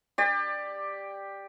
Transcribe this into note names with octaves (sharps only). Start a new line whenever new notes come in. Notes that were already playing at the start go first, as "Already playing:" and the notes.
G4 D5